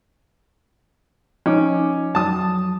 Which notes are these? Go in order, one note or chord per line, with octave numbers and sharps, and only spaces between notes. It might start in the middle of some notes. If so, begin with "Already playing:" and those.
F3 C#4 D#4 D6
F2 F#3 A5 D#6